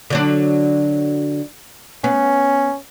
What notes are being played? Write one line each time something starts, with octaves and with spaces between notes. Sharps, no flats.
D3 F#3 D4
B3 C#4